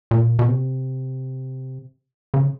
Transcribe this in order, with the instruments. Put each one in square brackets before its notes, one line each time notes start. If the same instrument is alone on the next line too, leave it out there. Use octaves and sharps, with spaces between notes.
[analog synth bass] A#2
B2
C3
C#3